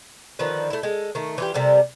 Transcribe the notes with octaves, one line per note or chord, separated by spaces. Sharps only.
D3 D#3 F3 B4
A3 E4
G#3 A4
D#3 A3
E3 F4 G4
C3 G3 A4 A#4